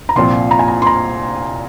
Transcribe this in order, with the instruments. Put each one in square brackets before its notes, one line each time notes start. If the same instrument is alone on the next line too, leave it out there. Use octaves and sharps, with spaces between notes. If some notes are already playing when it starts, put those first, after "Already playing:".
[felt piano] A#5
[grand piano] C2 A#2 F3 C4 [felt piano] C6
[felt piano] A#5
G#5
A#5
C6
A#5